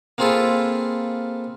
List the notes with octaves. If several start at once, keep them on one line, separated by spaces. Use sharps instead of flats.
A#3 C4 F4 G#4 A4 B4